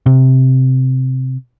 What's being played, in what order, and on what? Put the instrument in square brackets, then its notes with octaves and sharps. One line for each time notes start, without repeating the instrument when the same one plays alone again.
[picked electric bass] C3